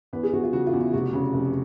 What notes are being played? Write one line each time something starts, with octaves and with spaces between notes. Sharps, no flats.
E2 B4
G#4
E2 F#4
F4
C#3 F#4
F4
E2
E4
F1 F#4
C#3
F1